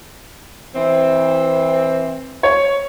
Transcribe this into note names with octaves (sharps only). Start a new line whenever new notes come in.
E3 C4
C#5